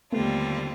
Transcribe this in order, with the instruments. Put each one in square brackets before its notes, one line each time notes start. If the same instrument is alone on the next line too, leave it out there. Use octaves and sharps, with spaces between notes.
[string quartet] D#2 D3 G3 C4 F4 [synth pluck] A3 B3